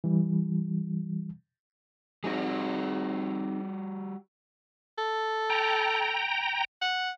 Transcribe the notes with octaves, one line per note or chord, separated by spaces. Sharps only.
E3 G3
G3 C4 D#4 F#4 G#4
A4
G5 A#5
F#5